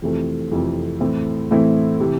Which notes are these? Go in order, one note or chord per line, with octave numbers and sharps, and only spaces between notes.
F2 C3 E3 A3 C4
F2 C3 E3 A3 C4
A2 E3 A3 C4 E4
A2 E3 A3 C4 E4
C3 E3